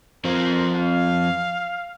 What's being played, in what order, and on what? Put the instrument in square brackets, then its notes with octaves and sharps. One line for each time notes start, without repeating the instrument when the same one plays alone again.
[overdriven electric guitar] F3 C4 [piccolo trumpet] A#4
[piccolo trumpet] F5